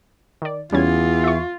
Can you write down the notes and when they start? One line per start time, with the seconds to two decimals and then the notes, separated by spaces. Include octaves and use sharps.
0.42 D#3 D5
0.72 E2 G3 C#4 F4 G#6
1.24 E5 C#6